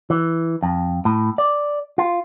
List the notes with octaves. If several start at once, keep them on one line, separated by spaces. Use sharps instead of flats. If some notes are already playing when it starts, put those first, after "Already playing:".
E3
F2
A2
D5
F4